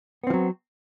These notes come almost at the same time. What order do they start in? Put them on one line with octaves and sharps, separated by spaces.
B3 C4 F3 F#3